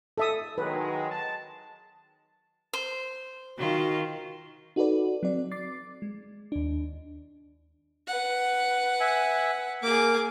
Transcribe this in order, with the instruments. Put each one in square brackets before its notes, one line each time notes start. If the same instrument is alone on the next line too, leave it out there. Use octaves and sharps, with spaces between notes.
[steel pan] A4 E5 D#6
[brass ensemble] D#3 F#3 G#3 [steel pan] B4
[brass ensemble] A5
[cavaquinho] C5
[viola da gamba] D#3 F4 [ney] F#4
[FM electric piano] D#4 F#4 A4 B4 D5
F#3 C4 D5
D6 A6 C7
G#3
D#2 D4
[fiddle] B4 F#5
[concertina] E5 G#5
[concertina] A#3 [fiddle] G#4 D6